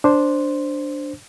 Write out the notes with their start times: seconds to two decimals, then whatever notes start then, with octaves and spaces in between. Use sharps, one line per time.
0.04 D4 C5